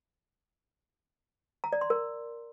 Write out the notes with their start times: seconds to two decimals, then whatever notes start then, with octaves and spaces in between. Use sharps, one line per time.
1.64 A#5
1.73 D5
1.81 C6
1.90 A#4